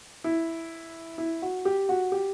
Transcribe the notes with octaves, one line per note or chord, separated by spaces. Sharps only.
E4
E4
F#4
G4
F#4
G4